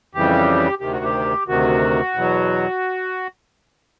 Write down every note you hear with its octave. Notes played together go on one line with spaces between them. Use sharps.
F2 C#3 E3 G3 G4
D2 C3 D#3 G4
F#4
G4
D2 C3 D#3 F#4
E2 B2 F#3